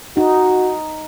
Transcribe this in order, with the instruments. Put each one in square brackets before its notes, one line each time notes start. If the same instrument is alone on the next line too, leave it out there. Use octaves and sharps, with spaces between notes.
[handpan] D#4 [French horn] F#4